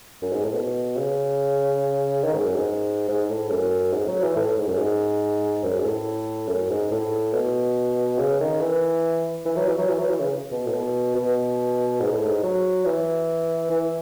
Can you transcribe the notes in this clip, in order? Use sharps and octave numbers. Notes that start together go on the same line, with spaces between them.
F#2
G#2
A2
B2
C#3
D#3
G#2
F#2
G#2
G#2
A2
F#2
G#2
F#3
E3
A2
G#2
F#2
G#2
F#2
G#2
A2
F#2
G#2
A2
B2
C#3
D#3
E3
E3
F#3
E3
F#3
E3
F#3
E3
C#3
B2
A2
B2
B2
G#2
A2
G#2
F#3
E3
E3